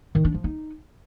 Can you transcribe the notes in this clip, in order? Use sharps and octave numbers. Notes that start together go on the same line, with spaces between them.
D#3
D4
F3
D#4